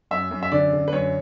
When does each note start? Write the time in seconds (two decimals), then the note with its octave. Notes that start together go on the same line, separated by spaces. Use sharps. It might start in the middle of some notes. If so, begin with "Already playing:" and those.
0.11 F#2 E5
0.31 F#2
0.43 E5
0.52 D3 D5
0.73 D3
0.88 B4
0.93 F#2 C#5